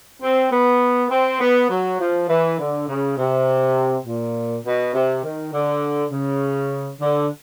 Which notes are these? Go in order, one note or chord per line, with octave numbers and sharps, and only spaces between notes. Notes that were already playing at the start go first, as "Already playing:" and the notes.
C4
B3
C4
B3
F#3
F3
E3
D3
C#3
C3
A#2
B2
C3
D#3
D3
C#3
D3